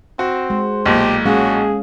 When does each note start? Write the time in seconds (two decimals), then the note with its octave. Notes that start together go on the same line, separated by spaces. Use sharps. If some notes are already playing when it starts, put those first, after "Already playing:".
0.19 C4 F#4
0.50 G#3 C5
0.86 B1 A#2 G4
1.26 G#3 C#4 F#4 G#4 F5